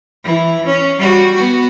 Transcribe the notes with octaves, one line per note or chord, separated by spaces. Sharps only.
E3 E4
C#4
G3 F#4
B3 F#4